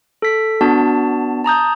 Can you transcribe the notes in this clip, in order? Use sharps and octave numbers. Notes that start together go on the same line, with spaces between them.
A4 B6
B3 D4 F#4 A5
A5 A#5 D#6 G6